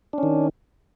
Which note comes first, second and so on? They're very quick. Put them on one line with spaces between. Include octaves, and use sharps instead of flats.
D4 C#4 D#3